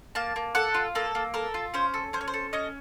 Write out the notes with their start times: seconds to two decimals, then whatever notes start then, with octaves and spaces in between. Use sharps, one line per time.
0.15 A#3 A5
0.36 A#3
0.55 A4 F#5
0.74 F4
0.95 A#3 A4
1.15 A#3
1.34 A4 A#4
1.54 F4
1.74 C#4 C5
1.94 A4
2.13 C#4 C5
2.21 C#5
2.28 C5
2.34 A4
2.53 C#4 D#5